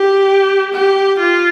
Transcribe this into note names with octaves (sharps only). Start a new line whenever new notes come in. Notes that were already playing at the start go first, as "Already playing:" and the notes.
Already playing: G4
G4
F4